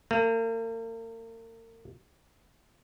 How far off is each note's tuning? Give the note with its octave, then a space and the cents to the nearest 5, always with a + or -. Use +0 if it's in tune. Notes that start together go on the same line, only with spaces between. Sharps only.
A#3 -40